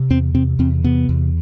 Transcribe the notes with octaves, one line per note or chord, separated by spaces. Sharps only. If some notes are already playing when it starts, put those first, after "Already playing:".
Already playing: C3
E2 C4
C3 C4
E2 C4
C3 B3
E2